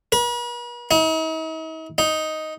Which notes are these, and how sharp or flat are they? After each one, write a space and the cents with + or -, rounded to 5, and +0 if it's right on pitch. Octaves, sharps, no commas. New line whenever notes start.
B4 -45
D#4 +45
D#4 +5